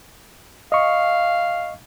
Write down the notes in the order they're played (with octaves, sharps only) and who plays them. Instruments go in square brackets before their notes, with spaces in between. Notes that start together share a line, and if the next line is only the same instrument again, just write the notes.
[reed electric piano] D#5 C#6 [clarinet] F5